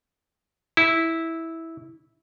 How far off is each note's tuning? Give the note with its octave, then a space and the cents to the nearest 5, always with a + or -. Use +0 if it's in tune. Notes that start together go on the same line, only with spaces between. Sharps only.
E4 -10